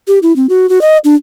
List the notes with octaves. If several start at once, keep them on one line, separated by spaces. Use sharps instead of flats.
G4
E4
C4
F#4
F#4
D#5
D4